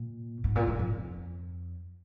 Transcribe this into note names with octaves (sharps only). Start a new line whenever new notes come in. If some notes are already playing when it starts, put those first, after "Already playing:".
Already playing: A#2
G#2
A#2
G#2
F2